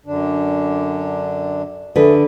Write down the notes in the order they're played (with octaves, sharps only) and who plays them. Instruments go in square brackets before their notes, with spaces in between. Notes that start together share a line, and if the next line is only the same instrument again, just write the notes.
[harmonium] F#2 D3 D4
[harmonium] D2 A3 G#4 [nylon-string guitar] D3 B4